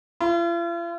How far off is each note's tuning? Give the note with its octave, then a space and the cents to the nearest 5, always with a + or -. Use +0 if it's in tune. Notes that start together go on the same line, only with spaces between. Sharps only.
F4 -45